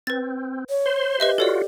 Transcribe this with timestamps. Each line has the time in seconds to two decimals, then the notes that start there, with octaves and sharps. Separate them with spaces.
0.07 C4 B4 A6
0.70 C#5
0.86 C5 C6
1.20 G4 B4 D#5 E5
1.38 F4 F#4 A4 C#5 D5